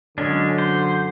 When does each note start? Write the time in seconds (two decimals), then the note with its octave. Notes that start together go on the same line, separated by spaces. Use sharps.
0.18 F#2 D3 G#3 C#4 D4
0.58 C5